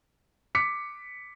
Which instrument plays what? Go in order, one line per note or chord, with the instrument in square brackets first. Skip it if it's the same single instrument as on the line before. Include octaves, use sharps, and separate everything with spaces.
[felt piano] D6 B6 C#7